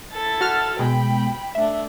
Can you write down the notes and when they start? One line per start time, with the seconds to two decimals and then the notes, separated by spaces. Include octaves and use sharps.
0.11 E4 A4 A6
0.41 F#4 F6
0.79 B2 G#3 G5 B5
1.55 A3 D4 E5